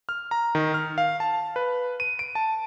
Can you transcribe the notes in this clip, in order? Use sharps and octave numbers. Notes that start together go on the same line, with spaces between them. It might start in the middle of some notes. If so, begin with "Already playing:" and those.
F6
A#5
D#3
F6
F5
A5
B4
D#7
D7
A5